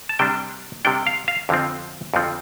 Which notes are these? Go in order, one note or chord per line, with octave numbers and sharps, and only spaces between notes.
A5
C3 G3 D4 G5
C3 G3 D4 G5
F5
F5
F2 D3 F3 C4
F2 D3 F3 C4